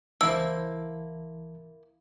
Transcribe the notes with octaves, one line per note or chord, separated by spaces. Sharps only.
C#2 E3 A#3 E4 C5 A5 E6